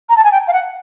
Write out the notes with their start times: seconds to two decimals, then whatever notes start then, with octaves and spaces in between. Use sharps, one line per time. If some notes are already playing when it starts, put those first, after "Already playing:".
0.09 A#5
0.17 A5
0.24 G#5
0.32 G5
0.48 F5
0.53 F#5